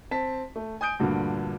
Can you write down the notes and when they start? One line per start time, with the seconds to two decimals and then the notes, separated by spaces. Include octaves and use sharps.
0.11 C4 A5 B6
0.56 A3
0.81 G#5 D#6 G6 D7
0.99 D2 G2 A#2 D3